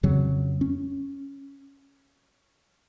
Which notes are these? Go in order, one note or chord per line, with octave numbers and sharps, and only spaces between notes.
F2 C#3 F#3
C#4